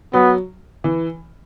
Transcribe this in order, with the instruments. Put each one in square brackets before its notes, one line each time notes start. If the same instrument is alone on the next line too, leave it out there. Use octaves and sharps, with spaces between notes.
[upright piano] F#3 [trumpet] B3
[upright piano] E3